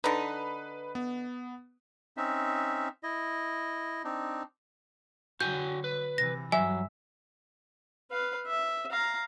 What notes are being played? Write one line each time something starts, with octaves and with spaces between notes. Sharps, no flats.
D3 D#4 B4
B3
C4 C#4 D#4 E5
E4 D#5
C4 D4 D#4
D3 F#3 F#4 G5 G#5 G6
B4
C3 E3 A#6
G2 F#3 E5 G#5
B4 F5
E5
F5 A#5